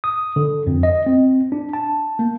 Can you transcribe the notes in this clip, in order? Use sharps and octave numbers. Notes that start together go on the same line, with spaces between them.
D#6
D3
F2
D#5
C4
D4
A5
A#3